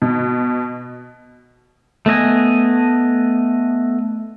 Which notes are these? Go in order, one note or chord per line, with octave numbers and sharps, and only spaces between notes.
B2
A3 B3 D#5 G#5